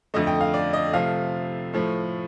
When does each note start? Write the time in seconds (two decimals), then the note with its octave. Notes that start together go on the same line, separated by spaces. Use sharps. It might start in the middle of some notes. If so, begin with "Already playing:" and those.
0.14 F2 D3 A3 D#5
0.27 G5
0.41 F5
0.54 D5
0.73 D#5
0.93 C3 F3 A3 F5
1.74 A2 F3 A3